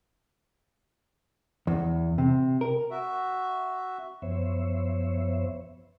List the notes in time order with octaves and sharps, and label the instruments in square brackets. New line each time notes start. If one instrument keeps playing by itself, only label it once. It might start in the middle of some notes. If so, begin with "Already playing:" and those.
[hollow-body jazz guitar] E2
C3
A#4
[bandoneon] F#4 E5
[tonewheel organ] F#2 F3 B3 C5 C#5 E5